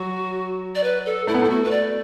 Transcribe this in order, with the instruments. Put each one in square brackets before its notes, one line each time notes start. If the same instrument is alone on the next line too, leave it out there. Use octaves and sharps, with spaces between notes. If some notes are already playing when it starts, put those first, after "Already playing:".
Already playing: [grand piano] F#3 [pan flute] F#4
[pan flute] D5
B4
A4
[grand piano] A3 [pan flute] E4
[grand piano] B3
[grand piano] A3 [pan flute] E4
[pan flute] F#4
B4
D5